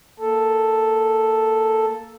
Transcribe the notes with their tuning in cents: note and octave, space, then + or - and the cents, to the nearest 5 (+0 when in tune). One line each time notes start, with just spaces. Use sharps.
A#3 -15 A4 +0